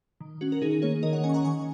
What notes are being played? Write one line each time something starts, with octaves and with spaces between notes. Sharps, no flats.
D#3
C#4 F#4
A#4
D#3 D#4 G#4
A#3 G#4 C#5
D#3 A#4 D#5
C#5 F#5
C#4 D#5 G#5
C#6
F#5 A#5
D#3 G#5 C#6